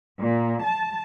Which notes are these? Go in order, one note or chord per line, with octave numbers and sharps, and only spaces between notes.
A#2
A5